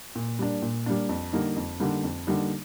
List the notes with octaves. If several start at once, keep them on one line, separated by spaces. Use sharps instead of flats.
A#2
G3 A#3 D4
A#2
G3 A#3 D4
F2
D3 G3 A#3 D#4
F2
D3 G3 A#3 D#4
F2
D3 G3 A#3 D#4